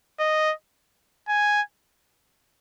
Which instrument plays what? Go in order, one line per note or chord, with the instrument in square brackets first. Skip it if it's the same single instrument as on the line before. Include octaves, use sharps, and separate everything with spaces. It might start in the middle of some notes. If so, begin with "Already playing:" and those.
[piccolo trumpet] D#5
G#5